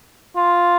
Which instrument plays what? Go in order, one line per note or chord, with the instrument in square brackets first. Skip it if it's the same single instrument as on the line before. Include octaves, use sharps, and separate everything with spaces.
[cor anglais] F4